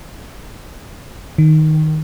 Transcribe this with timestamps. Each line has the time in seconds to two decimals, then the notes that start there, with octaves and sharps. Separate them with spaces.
1.38 D#3